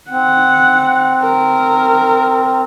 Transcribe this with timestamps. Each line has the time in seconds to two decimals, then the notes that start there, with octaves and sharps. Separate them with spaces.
0.11 C4 F#5
1.24 A#4